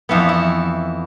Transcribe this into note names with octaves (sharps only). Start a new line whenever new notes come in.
F2 E3 B3
E4